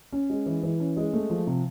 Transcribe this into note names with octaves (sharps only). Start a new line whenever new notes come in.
C#4
G#3
E3
E3
C#4
G#3
A3
F3
C3